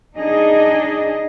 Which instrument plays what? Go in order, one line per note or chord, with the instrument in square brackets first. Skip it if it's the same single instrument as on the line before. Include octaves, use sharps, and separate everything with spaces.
[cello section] D4 D#4 G#4 D#5